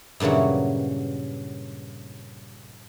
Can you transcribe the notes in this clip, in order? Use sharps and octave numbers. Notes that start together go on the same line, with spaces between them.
G2 A#2 C#3 E3 F#3